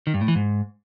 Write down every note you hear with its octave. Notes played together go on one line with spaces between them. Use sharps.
D#3
G2
A2
E3
G#2